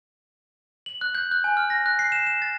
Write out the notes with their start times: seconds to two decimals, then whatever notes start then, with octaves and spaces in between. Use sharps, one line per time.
0.86 F#7
1.01 F#6
1.15 G6
1.31 F#6
1.44 G#5
1.57 F6
1.70 A#6
1.86 F#6
1.99 C7
2.12 E7
2.27 E7
2.42 A6